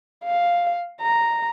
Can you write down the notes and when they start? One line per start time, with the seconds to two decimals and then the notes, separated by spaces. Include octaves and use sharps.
0.24 F5
1.01 A#5